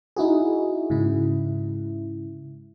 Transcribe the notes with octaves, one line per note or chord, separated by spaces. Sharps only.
D#4 E4 F#4 G#4
G#2 C#3 E4